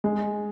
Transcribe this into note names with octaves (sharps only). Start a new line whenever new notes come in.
G#3